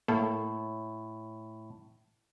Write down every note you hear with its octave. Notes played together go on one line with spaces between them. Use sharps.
A2 A#3 A4